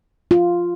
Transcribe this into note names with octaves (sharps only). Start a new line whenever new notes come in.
F4